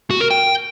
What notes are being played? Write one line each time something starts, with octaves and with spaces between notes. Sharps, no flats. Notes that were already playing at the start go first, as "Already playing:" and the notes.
F#4
A#4
G5